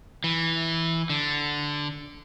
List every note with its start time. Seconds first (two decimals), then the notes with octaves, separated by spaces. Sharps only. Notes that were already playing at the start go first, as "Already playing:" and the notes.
0.24 E3
1.10 D3